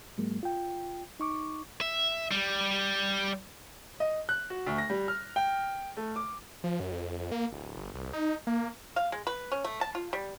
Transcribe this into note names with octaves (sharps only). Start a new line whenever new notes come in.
G#2 F#3 G#3 A#3
F4 G5
D#4 C#6 D6
E5
G3
D#5
F#6
F#4
D2
A#6
G3
F6
G5
A3
D6
F3
F#2
F2
A#3
D1
G1
C2
D#4
A#3
F5
G#3
B4
C#4
A3
A5
F4
G3